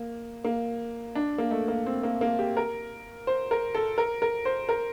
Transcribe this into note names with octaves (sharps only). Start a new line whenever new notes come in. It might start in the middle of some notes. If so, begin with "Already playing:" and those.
Already playing: A#3
A#3
D4
A#3
A3
A#3
C4
A#3
A#3
G4
A#4
C5
A#4
A4
A#4
A#4
C5
A#4